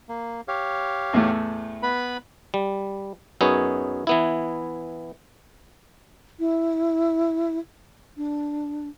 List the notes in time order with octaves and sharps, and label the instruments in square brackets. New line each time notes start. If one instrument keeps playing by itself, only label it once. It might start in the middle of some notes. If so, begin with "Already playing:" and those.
[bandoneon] A#3
G4 C#5 F5
[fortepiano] E2 A2 A3
[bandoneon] B3 B4 B5
[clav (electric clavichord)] G3
F#2 B3 D#4 G#4 C#5
E3 B3 E4
[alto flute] E4
D4